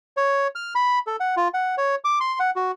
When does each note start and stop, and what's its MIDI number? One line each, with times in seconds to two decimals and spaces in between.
0.17 0.47 73
0.55 0.74 89
0.75 0.99 83
1.07 1.16 69
1.20 1.35 78
1.37 1.48 65
1.54 1.75 78
1.78 1.95 73
2.04 2.19 86
2.20 2.39 84
2.40 2.50 78
2.56 2.72 66